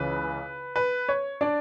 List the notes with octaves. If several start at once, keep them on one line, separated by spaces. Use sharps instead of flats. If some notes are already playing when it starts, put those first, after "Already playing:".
Already playing: C#2 C#3 E3 B4
B4
C#5
D4 D5